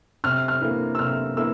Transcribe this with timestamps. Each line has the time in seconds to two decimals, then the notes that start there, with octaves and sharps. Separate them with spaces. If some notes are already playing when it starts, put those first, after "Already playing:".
0.24 C3 F6
0.48 F6
0.61 E3 A#3
0.95 E6
0.99 C3 F6
1.37 E3 A#3 E6